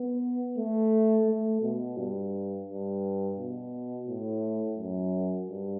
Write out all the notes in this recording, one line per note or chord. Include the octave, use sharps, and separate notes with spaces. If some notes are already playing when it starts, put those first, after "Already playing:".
Already playing: B3
A3
A3
B2
G2
G2
B2
A2
F#2
G2